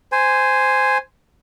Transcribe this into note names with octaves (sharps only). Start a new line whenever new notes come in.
C5 G#5